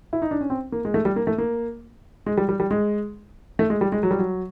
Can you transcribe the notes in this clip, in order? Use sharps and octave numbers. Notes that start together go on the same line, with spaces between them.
E4
D#4
D4
C#4
C4
A#3
G#3
A3
G3
A#3
A3
A#3
G#3
G3
G3
G3
G#3
A3
G#3
G3
G#3
F#3
G3
F#3